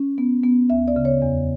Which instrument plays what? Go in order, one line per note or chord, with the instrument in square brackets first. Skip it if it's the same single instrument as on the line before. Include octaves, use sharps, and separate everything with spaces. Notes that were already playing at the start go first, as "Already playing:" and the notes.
Already playing: [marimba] C#4
B3
B3
D2 E5
D5
C#3
C#5
E2